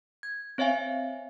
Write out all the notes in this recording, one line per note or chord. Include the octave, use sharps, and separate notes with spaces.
G#6
C4 C#5 E5 F5 G#5